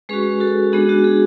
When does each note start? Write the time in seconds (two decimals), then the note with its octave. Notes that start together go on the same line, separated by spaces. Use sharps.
0.09 G#3 C#4 F#4 G#4 B4
0.40 F#4 A4
0.72 G#3 B3 D4 F#4 G#4
0.89 F#4
1.04 G#4